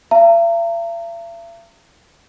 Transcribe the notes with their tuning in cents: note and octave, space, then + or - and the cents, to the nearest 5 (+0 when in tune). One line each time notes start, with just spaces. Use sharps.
E5 +45 A#5 -35